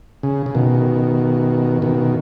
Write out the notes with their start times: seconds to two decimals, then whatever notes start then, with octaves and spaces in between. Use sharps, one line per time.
0.23 C#3
0.46 C#3
0.55 B2 D#3
1.82 B2 D#3